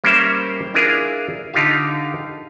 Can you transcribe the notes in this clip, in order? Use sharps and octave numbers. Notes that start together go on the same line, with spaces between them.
G3 A#3 C#4 A#4 C5 E5
D4 E4 F4 G#4 A#4 F5
D3 D#4 F4 G4 F5